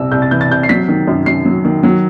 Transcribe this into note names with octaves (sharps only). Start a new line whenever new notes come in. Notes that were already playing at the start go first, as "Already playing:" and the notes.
Already playing: C2 C3 E6
C2 G6
A6
E3 G6
A6
C3 G6
C7
F#3 B6
D#3
F#2
F#2 C7
F#3
D#3
F#3